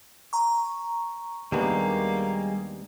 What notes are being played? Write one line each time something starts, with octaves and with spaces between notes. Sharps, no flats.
A#5 C#6
D#2 G3 G#3 A#3 B3 D4